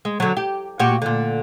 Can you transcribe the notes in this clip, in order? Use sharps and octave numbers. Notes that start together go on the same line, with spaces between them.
G#3
D3 F#3
G4
A#2 F#4 G4
A#2 D3